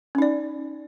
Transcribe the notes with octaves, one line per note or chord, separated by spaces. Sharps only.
C#4 D#4 D5